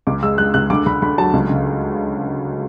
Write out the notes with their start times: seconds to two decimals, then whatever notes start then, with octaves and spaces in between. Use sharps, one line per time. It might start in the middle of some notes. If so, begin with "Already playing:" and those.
0.07 C#2 D6
0.22 G#3 E6
0.38 G#3 F#6
0.54 C#2 F#6
0.70 D2 D6
0.86 D2 B5
1.02 D2 B5
1.18 F#3 A5
1.33 C#2
1.50 C#3